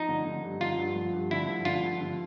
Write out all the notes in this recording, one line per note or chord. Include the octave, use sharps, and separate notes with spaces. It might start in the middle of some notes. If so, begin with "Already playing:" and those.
Already playing: F3 D#4
D3
D3
G2
D3 F4
G2
F3
G2
D3 E4
F3
D3 F4
F3
D3